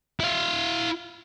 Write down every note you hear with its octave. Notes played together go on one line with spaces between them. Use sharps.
E4 F5